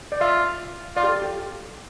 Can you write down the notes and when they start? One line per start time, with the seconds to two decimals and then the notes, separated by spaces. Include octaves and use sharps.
0.12 D5
0.21 F4 E5
0.96 F4 D5
1.04 G4
1.09 A4
1.22 G4